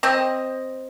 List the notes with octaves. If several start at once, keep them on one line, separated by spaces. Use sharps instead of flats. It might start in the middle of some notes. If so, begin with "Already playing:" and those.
C4 D#5